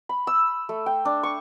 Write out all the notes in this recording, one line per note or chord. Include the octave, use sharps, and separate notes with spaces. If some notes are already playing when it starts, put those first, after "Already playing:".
B5
E6
A3
G5
D4
C#6